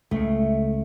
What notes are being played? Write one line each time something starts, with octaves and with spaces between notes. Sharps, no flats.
C#2 C#3 A3